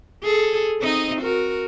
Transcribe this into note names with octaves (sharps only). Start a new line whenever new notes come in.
G#4 A4
C4 D#4 D#5
F#4 A#4